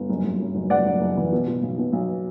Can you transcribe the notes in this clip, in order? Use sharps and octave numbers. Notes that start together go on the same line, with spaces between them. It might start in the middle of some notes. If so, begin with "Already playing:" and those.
Already playing: G1
F#1
F#1
F#2
F#1
F#1 D5 F#5
F#1
F#1
E3
B2
B2
B1
B2
B1